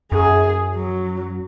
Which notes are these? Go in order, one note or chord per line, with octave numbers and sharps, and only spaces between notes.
F#2 G#4
F#3